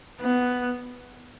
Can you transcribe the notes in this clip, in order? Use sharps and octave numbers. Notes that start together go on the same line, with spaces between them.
B3